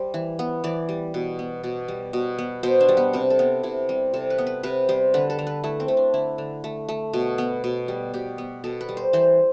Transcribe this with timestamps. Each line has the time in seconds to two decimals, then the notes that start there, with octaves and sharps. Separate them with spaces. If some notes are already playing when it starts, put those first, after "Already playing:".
Already playing: G3 C5
0.14 E3
0.39 B3
0.64 E3 D5
0.89 G3
1.14 B2
1.39 B3
1.64 B2 D5
1.88 G3
2.13 B2
2.38 B3
2.63 B2 C5
2.81 D4
2.89 G3
2.97 B3
3.13 C3 C4
3.30 A4
3.39 B3
3.63 C3 E4
3.89 G3 C4
4.14 C3 A4
4.30 B4
4.38 B3
4.47 B4
4.63 C3 B4
4.89 G3 C5
5.14 D3 B4
5.30 A4
5.39 D3
5.47 B4
5.64 A3 E4
5.80 C4
5.88 A3
5.97 D4
6.14 D3 E4
6.38 D3
6.64 A3
6.89 A3
7.13 B2
7.38 B3
7.64 B2
7.88 G3
8.14 B2 G4
8.38 B3
8.64 B2 A4
8.81 B4
8.88 G3
8.97 C5
9.13 E3 C5